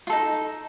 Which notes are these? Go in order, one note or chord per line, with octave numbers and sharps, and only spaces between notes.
D#4 F4 A4